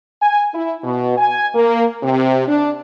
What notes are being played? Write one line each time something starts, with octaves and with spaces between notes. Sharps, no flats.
G#5
E4
B2
G#5
A#3
C3
D4